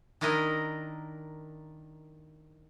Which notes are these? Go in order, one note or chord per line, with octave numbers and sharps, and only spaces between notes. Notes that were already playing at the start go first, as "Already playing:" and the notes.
D#3 D4 E4 A#4 D#5